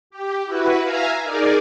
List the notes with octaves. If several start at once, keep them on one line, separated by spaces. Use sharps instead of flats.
G4
E4 F#4 B4
E5 F5 G#5 A#5
D#4 G#4 A#4 D5